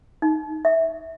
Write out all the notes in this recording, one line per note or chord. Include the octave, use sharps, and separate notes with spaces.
D#4
E5